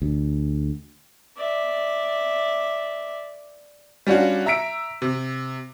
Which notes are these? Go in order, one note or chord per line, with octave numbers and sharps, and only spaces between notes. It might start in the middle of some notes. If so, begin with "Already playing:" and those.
D2
D5 E5
G3 C#4 D4 F4 F#4
E5 A#5 E6 B6 D7
C3